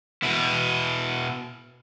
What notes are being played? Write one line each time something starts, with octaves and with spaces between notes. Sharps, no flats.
B2 E4